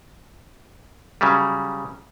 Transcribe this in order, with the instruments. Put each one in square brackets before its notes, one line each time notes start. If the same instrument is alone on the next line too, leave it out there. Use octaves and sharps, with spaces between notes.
[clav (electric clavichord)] C#3 F#3 G3